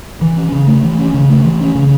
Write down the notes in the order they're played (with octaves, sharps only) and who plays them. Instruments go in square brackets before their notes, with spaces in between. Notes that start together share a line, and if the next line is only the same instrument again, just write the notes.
[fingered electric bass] E3
C#4
C#3
A3
E3
C#4
C#3
A3
E3
C#4
C#3